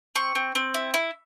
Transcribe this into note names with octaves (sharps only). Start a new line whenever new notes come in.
C4 C#6
C4
C4
E4
E4